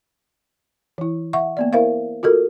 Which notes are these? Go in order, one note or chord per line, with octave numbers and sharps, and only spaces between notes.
E3 E4
E5 F#5 C#6
A#3 B3 D5
E4 A#4 C5 E5 F5
F4 F#4 A4 A#4